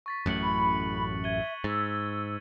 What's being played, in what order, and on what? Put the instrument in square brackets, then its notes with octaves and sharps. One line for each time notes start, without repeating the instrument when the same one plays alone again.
[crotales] C#6 A6 B6
[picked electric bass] A1 F#2 A2 [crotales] F#6 C#7 F#7
[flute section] B5
[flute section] E5 [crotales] G#6 D#7 G7
[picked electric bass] G#2 [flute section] E6 [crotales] A6